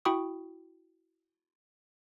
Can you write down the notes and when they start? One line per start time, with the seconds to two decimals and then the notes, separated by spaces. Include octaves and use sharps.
0.05 E4 F#4 G5 B5 C#6 D#6